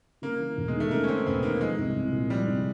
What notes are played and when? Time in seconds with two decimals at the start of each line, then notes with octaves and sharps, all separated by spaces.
0.22 C#3 A#3
0.40 E3
0.57 E1
0.68 G#3
0.74 D#2
0.80 A3
0.91 C#3 A#3
1.04 C#4
1.08 E3 C4
1.26 E1 B3
1.43 D#2 A#3
1.60 F3 G#3
1.78 C2
1.95 C2
2.12 A#2
2.30 F3 G3
2.47 C2